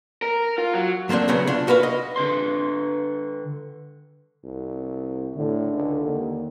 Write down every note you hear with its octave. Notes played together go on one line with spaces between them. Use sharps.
A#4
F4
F#3
F#3 A3 A#3 C4 D4
D2 C#3 F#3 B3
D4 F4
F#4 A#4 B4 F5
D#5
D3 B4 C6
C2
A2 D3
C#2
D#2